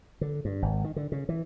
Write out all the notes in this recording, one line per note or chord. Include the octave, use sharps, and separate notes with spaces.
D3
G2
G#1
D#3
D3
C#3
E3